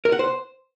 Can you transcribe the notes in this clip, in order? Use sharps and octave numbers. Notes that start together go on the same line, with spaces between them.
A#4
F#5
C5